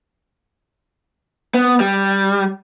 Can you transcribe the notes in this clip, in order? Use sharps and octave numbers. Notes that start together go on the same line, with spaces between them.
B3
G3